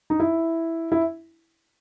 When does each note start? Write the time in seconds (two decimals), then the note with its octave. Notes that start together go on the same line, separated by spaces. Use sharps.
0.10 D#4
0.20 E4
0.92 E4